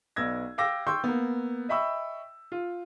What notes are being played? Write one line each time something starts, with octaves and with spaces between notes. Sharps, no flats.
B1 B3 D5 E6 G#6 A#6
F5 G5 D6 E6 A#6
G5 C6 C#6 E6 G6
A#3 B3
D#5 E5 G5 B5 C#6 E6
F4